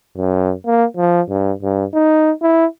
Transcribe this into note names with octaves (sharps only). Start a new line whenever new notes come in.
F#2
A#3
F3
G2
G2
D#4
E4